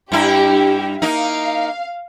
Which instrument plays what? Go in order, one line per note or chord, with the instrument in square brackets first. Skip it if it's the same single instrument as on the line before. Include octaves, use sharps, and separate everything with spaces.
[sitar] G2 E4 [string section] G4
[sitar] A#3 D#4 [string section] F5